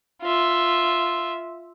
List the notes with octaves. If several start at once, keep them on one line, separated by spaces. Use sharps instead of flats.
F4 E5